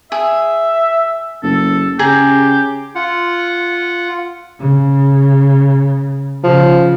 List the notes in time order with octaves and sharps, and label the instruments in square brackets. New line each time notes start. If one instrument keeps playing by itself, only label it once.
[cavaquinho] G#4 [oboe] E5
[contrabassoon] F#1 [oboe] A4
[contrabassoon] C#3 [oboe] G4 [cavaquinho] G#4 A#5
[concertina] F4 F#5
[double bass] C#3
[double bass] C#3 [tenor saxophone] F3